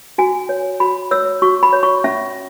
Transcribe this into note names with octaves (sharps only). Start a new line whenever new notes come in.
F#4 G#5
C#5
F#4 B5
C#5 E6
F#4 C#6
B5
C#5
C#6
C#4 E5